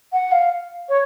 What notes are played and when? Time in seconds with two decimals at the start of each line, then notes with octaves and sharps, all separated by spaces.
0.13 F#5
0.32 F5
0.89 C#5